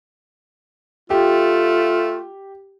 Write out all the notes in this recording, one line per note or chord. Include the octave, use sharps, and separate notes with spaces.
A3 F4 G4